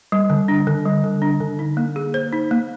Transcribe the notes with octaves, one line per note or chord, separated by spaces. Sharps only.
G3
D3
D4
D3
G3
D3
D4
D3
D#4
A#3
G#4
C5
D#4
A#3